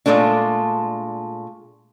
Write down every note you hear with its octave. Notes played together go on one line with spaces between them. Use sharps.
A#2 D#3 G#3 A3 D4